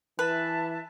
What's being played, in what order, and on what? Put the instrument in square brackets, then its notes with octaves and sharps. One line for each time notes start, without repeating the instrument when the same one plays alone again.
[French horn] E3 [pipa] B4 [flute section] E5 A5